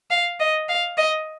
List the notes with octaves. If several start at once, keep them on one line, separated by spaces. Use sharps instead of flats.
F5
D#5
F5
D#5